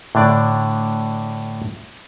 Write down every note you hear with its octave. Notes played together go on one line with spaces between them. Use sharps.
A2 D3 D4 D5